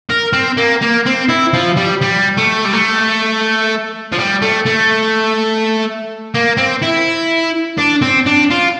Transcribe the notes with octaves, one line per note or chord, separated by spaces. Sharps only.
A#4
C4
A#3
A#3
C4
E4
F3
G3
G3
A3
G3
A3
F3
G3
A3
A3
A#3
C4
E4
D4
C4
D4
F4